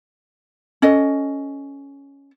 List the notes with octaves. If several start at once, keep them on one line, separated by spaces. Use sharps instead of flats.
C#4 A4 D#5